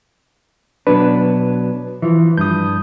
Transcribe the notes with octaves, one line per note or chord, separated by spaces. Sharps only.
B2 F#3 D4 B4
E3 F3
G2 D#6 G6